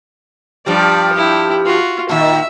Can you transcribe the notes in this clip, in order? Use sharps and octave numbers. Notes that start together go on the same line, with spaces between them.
G2 F3 G3 D5
E4 G4
F4 F#4
A#2 D#3 E5